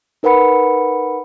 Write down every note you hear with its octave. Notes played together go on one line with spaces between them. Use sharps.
D#4 A#4 B4 F#5 B5 C#7